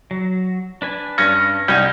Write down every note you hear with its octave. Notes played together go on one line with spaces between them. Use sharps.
F#3
D4 B4 G#5
G2 C#4 A#6 C#7
C2 C#4 D#4 G5